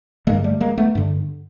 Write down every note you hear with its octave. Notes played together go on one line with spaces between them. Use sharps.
G2 D3 G#3 A#3
G3 A3
G#3 A#3
A3 B3
G2 D3